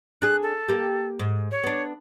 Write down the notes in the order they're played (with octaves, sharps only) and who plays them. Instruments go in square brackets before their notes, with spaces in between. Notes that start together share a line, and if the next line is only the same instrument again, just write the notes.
[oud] D4 G#4 [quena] F#6
[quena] A4
[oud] A#3 G4
G#2
[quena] C#5
[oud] B3 D4